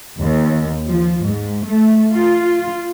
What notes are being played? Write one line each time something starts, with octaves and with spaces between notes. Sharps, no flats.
D#2
F3
G#2
A3
F4